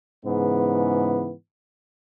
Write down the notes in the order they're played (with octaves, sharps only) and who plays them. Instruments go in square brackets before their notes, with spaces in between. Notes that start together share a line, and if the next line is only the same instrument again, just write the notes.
[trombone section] G#2 C#3 E3 B3